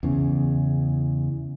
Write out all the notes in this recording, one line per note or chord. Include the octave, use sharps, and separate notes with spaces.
E2 C#3